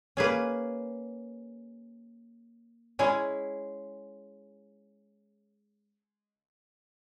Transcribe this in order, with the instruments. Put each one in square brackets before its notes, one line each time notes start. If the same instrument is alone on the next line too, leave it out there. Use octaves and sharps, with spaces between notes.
[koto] A#3 C#4 G#4 B4
G#3 C#4 E4 G#4